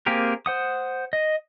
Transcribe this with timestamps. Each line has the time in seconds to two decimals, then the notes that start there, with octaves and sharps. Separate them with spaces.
0.06 A#3 C4 G4 G#4 A#4
0.46 C5 F#5 D#6
1.13 D#5